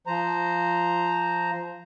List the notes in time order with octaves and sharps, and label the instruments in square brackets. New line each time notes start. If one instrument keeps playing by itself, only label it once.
[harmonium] F3 C5 A#5